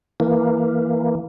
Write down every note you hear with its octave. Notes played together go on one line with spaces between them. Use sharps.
E3 A#3